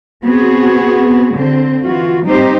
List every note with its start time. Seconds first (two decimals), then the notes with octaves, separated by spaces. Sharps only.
0.22 B3 C4 F#4 G#4
1.35 D3 C4
1.84 E3 F4 F#4
2.25 G3 C4 D#4 G4 C5